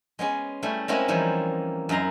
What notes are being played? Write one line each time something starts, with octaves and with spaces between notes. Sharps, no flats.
G#3 B3 C#4 G#4
G3 A3 C#4 E4
G#3 A#3 C4 C#4 E4 F#4
E3 F3 G3 G#3 D#4 E4
F#2 D#4 E4 A#5 C6